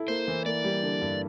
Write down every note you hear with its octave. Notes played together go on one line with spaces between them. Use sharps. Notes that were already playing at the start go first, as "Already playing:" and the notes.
Already playing: E4 A4
A#3 C5
E3
A#3 D5
G3
D3
G2